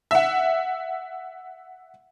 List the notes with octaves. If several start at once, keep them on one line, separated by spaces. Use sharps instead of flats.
E5 F#5